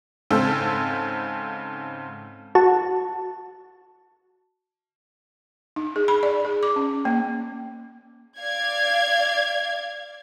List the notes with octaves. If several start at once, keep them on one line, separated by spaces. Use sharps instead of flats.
G#2 C#3 C4 A4 E6
F#4 A5
D#4
G#4
B5
D5
G#4
D6
C#4
A#3
D5 F5 G#6